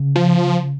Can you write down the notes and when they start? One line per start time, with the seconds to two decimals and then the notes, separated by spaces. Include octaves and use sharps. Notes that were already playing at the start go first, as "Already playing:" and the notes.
Already playing: C#3
0.16 F3